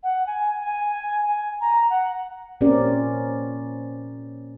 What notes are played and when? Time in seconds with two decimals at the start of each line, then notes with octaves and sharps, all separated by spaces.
0.03 F#5
0.27 G#5
0.60 G#5
0.89 G#5
1.28 G#5
1.61 A#5
1.90 F#5
2.61 A#2 C4 C#4 G4 A#4 D5